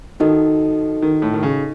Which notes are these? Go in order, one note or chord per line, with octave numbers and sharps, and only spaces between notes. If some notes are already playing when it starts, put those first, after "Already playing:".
D#3 D#4 F#4 A4 D#5
D#3
A2
D#3
C#3